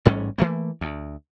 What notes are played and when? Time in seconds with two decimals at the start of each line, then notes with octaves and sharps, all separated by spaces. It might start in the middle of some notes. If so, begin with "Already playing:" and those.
0.05 A1 G#2 G3 C#4
0.38 E3 A3 A#3
0.81 D2